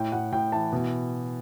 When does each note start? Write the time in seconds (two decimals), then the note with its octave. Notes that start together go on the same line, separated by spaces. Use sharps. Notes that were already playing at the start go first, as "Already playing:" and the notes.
Already playing: A2 G5
0.12 A2 F#5
0.32 A2 G5
0.52 E3 A5
0.72 B2